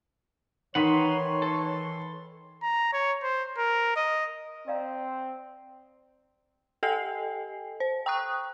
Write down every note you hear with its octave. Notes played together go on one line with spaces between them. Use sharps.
D#3 E3 D#4 B4 C#5 F#5 C6 B6
A4
A#5
C#5
C5
A#4
D#5
C4 D5 F5 A#5
G4 A4 D#5 G5 G#5 C7
C5
G5 A#5 C#6 D#6 F#6